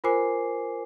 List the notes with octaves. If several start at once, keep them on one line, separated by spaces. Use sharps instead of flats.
F4 A#4 C5 G#5 D6 C7